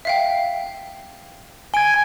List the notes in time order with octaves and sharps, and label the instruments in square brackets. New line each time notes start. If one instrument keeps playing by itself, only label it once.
[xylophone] E5 F5 G5
[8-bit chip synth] G#5 G#6 [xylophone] D7 G7